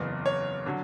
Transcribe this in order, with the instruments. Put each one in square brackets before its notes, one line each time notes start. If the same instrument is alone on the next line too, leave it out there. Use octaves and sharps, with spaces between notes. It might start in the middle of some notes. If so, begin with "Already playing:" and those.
Already playing: [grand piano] F#1 E2 C#3
C#5
D3 F#3